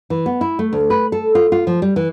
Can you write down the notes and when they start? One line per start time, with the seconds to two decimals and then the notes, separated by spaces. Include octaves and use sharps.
0.10 E3
0.26 B3
0.41 E4
0.59 A3
0.73 D2
0.90 B4
1.12 A4
1.35 F4
1.52 F4
1.67 F3
1.82 G3
1.96 E3